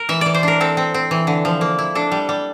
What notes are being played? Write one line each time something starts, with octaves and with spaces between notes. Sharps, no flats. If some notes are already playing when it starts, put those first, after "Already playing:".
Already playing: A#4
E3 E5
E3 D5
C5
D4 A#4
C4 A4
C4
C4
E3
D3
F3
A#3
E4
D4 A4
G3
G3